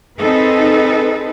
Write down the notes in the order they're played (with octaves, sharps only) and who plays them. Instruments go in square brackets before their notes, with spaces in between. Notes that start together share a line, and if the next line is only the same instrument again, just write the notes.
[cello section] C4 D#4 G#4 A4 B4